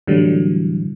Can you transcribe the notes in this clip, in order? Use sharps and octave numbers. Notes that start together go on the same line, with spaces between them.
A2 D3 E3 F#3 G3